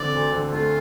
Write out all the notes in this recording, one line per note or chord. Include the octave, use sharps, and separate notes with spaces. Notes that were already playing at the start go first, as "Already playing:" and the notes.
Already playing: D3 C4 D5
D2
D3
A3 F4